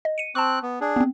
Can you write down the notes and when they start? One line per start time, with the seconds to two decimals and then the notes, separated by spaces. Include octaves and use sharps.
0.05 D#5
0.18 C#7 D#7
0.35 C4 A5 C#6 F#6
0.62 B3
0.81 D4 G#4
0.96 B3 C4